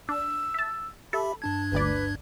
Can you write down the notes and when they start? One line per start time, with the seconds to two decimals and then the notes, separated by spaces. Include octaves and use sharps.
0.09 D4 E6
0.54 E5 A5
1.13 G4 A4 E5 B5
1.42 G2 D4 A5 G#6
1.72 G1 D2 B4 D5